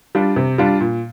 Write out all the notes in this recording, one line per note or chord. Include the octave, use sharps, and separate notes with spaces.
G3 D4 F4
C3
G3 D4 F4
A#2